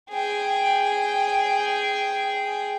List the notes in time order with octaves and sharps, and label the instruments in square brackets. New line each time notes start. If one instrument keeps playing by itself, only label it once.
[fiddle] G#4 G5